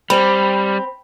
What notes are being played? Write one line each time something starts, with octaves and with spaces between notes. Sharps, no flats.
G3 C4 B5